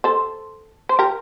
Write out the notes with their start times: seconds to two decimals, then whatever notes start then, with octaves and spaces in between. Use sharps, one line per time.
0.04 A4 C5
0.89 C5
0.99 G4 A#4